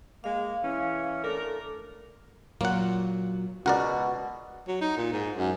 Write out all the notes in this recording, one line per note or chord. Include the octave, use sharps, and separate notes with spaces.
G#3 A#3 F5
E3 C#4
A3 D4 A4 A#4
A#2 F#3 A#3 F4 F#5
C#2 B2 F#4 A#4 D5 F#5
F#3
D#4
A#2
G#2
F#2